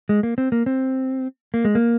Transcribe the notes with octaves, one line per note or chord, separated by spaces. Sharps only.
G#3
A#3
C4
A#3
C4
A#3
G#3
A#3